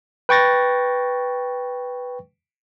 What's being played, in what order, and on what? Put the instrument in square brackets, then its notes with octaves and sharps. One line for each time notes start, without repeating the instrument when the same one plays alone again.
[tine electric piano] B4 G5 C#6 A6 A#6